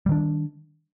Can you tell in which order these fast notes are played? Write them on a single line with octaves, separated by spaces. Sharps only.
G3 D#3 D4